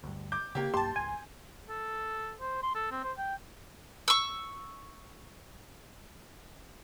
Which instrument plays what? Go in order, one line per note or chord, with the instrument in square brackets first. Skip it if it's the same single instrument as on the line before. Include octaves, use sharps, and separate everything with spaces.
[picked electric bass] D2 G2
[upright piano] D6 G6
[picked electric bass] C#3 [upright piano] A#3 G4
[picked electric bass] B1 G2 A#3 [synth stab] G4 A5 [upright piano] C6
[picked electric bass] G#1 C#2 [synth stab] G#5
[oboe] A4
C5
C6
A4
C4
C5
G5
[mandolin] C#6 E6